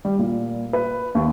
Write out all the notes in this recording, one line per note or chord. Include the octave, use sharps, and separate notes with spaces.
G3
A#2
B4
D#2